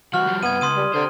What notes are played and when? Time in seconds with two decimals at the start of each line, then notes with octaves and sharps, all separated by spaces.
0.14 E3 G3 F#4 F6
0.27 F3 G3
0.43 G2 B3 E4 G#6 D#7
0.61 C#2 C6 D#6 D#7
0.76 G3
0.94 D3 G4 C5